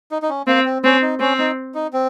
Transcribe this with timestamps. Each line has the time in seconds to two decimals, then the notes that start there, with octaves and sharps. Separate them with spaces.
0.11 D#4
0.22 D#4
0.30 C#4
0.47 A#3 C4
0.66 C4
0.84 C4 C#4
1.02 D#4
1.20 C4 C#4
1.39 D#4
1.75 D#4
1.93 C4